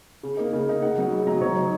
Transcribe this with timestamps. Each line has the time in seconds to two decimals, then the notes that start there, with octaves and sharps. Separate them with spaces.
0.23 C#3
0.37 A#3 D#4
0.53 C#3
0.67 A#3 D#4
0.82 C#3 F#5
0.98 F#3 D#4
1.12 C#3
1.27 F#3 D#4 A#5
1.41 F#3 C#5
1.57 D#4